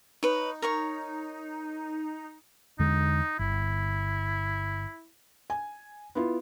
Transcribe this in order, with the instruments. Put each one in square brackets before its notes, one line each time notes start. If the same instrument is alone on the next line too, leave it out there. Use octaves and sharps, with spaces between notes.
[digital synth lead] D#4 [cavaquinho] B4 C#5
[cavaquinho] A#4 C#5 C#6
[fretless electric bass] E2 D3 G#3 [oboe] D#4
[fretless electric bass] G1 [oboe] E4
[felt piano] G#5
B3 E4 F4